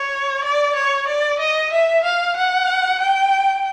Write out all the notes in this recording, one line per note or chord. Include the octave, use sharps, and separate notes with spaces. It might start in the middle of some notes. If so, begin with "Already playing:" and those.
Already playing: C#5
D5
C#5
D5
D#5
E5
F5
F#5
G5